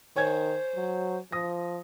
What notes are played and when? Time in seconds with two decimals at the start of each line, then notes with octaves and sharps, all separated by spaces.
0.16 D#3 C5 C#5 G#5 G#6
0.76 F#3
1.32 F3 D#6 A#6